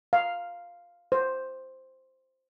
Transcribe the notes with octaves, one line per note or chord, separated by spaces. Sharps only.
F5
C5